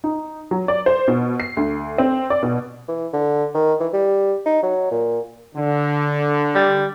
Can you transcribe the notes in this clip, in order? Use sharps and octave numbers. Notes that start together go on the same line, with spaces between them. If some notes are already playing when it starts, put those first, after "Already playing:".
D#4
F#3
D5
C5
B2
C7
D2
C4
D5
B2
E3
D3
D#3
E3
G3
D#4
F#3
A#2
D3
G3